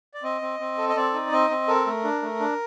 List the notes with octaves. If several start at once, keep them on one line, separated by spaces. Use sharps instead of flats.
D5
C4 D#5
C4
C4
A4
D#5
C4 D5
D#4
C4 D#5
C4
A4 A#4
A3
D4
A3
D4